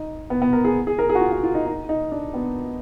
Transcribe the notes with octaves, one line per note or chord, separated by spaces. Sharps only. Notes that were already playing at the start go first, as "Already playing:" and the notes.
Already playing: D#4
B3
B3
A#4
G#4
G#4
A#4
G#4
F#4
F4
F#4
F4
D#4
D#4
D#4
D4
B3